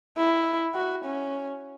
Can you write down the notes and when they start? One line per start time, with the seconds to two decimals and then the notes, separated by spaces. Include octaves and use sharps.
0.17 E4
0.75 F#4
1.05 C#4